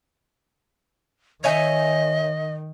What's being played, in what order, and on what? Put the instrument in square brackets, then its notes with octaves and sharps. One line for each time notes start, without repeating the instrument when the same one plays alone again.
[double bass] D#3 [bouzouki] C#5 E5 G#5 [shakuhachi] D#5